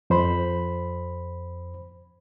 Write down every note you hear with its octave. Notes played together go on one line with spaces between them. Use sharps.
F2 C5 B5